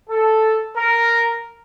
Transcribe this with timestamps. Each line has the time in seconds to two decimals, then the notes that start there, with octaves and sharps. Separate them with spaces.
0.10 A4
0.76 A#4